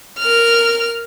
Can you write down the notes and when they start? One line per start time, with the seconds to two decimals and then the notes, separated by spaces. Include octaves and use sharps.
0.19 A#4 F6